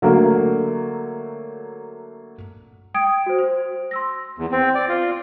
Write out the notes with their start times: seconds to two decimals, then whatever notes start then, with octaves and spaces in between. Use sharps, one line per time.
0.02 D3 F#3 A3 A#3
2.94 G5 D#6 G#6 D7
3.26 F#4 C5
3.38 C5
3.91 C6 E6 A#6
4.38 E2
4.52 C4
4.75 D5
4.89 F4